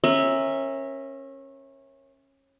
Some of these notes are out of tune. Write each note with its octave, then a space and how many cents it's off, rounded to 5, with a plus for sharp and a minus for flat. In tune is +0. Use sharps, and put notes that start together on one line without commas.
C#4 -25 A#4 +5 E5 -5